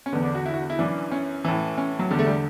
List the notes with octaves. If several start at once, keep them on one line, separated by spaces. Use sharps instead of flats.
C#4
E2 D3 B3
D4
F#4
E4
F#4
E4
F#2 E3 D4
C#4
A2 E3
C#4
F#3
E2 D3 G3
A3
G3